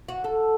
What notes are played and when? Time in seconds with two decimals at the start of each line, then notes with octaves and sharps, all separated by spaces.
0.09 F#4
0.24 A4